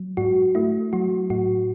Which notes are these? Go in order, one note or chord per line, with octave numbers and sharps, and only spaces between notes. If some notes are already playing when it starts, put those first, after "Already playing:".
Already playing: F#3
G#2 F#4
A3 E4
F#3 F#4
A2 F#4